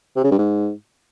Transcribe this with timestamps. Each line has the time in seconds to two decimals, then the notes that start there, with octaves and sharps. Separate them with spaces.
0.16 C3
0.24 C#3
0.31 G2
0.38 G#2